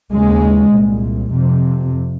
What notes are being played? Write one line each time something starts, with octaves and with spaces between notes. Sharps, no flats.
D#2 C#3 G#3
C2 A#2
F2 C3